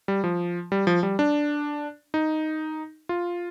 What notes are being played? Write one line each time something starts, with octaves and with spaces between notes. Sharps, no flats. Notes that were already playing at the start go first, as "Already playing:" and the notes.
G3
F3
G3
F3
G3
D4
D#4
F4